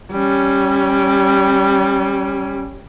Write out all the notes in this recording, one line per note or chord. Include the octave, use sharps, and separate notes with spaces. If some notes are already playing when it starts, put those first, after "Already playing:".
G3 C#4